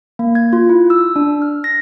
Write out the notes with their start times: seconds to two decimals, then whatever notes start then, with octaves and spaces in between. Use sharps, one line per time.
0.19 A#3
0.35 G#6
0.53 F4
0.69 E4
0.90 E6
1.16 D4
1.42 F6
1.64 A#6